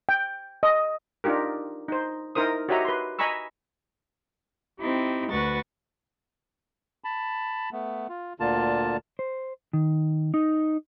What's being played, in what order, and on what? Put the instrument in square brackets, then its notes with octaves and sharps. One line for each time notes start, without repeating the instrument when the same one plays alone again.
[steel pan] G5
D#5
D4 D#4 F4 G4 A#4
D#4 C5
D#4 E4 A#4 C5 D#6
F#4 G4 C#5 D#5 E5 A#5
B4 C6
D#5 G#5 A#5 B5 C#6 E6
[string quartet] C4 D#4 E4 G4
D2 F#4 B4 C#6 A6
[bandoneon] A5 B5
A3 B3
F4
D2 A#2 D3 A#3 F4 A5
[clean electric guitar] C5
D#3
D#4